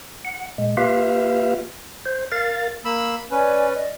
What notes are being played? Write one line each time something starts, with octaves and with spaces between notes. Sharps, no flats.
F#5
A#2 G#3
A#3 F4 G4 B4 E5 F5
C5
A#4 F5 A6
A#3 B5 E6
C#4 B4 D5 G#5
D5 D#5